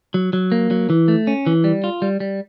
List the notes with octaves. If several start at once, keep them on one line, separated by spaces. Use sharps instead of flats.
F#3
F#3
A#3
F#3
E3
A3
C#4
E3
G3
F4
G3
G3